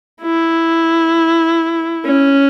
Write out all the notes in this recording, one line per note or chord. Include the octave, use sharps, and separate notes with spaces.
E4
C#4